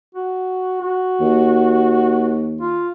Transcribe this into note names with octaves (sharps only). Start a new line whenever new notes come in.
F#4
F#4
D#2
F4